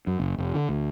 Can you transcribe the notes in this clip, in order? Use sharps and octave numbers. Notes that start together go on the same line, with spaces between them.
F#2
F#1
F1
D3
D2